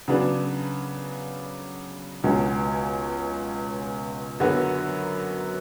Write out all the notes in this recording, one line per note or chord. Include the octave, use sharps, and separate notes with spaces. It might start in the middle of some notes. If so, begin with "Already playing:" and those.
C#3 F#3 B3 D4
C#2 B2 G#3 C#4
F#2 D3 F#3 B3 F#4